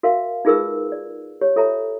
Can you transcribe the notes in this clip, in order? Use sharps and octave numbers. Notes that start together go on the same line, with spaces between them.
F#4 A#4 E5 F5
D#4 F4 G#4 A#4 B4 E6
D5
G4 C#5
F4 A4 C#5 E5 A5 A#5